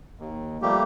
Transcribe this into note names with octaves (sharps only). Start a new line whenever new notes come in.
D#2
F3 G3 A3 A#3 G4